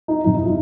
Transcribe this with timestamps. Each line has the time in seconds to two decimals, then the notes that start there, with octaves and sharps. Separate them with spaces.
0.08 D#4
0.24 G1 F2 C3 D#4
0.35 E4
0.45 F4